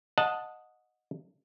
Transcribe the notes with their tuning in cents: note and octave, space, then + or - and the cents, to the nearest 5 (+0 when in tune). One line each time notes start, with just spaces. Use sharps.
D#5 +0 F#5 -20 A5 +0